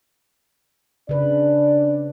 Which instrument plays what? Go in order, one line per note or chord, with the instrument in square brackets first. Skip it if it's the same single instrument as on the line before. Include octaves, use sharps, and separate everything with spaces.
[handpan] C#3 B4 [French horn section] D4 D5